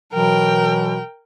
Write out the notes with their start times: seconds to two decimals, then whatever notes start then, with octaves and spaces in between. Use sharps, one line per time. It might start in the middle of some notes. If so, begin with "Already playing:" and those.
0.13 B2 E3 F#3 A#4 G5